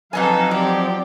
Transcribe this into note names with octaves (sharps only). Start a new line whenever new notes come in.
F2 F#3 D#4 A4 B4 D#5 F5 G#5
F3 C4 G4 D5